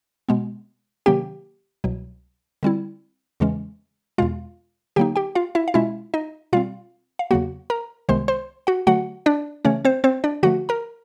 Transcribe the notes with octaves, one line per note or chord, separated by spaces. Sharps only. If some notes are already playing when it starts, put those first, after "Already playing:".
B2 G#3 B3
C3 D#3 F#3 A#3 C#4 G4 G5
C2 B2 F#3
D3 G3 C4 E4
E2 C#3 E3 G#3 C#4
E2 B2 G#3 F4 F5
D3 F#3 A#3 D#4 G4 G5
G4 G5
F4 F5
E4 E5
F5
B2 G#3 C#4 E4 F4 E5
D#4 D#5
B2 G3 C4 F4 F5
F5
E2 C#3 F#3 A#3 F#4 F#5
A#4 A#5
C2 C3 D#3 G#3 B3 C5 C6
C5 C6
F#4 F#5
D3 F#3 A3 F#4 F#5
D4 D5
C#3 E3 A3 C#4 C#5
C4 C5
C4 C5
D4 D5
D3 F3 A3 F#4 F#5
A#4 A#5